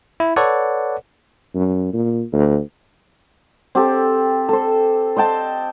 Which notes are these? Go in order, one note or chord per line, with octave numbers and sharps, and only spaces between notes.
E4
A4 B4 C#5 D5 F#5
F#2
A#2
D2
C4 G4 A4
A4 C5
C5 D#5 G5 A5